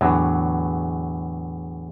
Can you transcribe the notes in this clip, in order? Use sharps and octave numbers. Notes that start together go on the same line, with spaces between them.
E2 A2 D3 F#3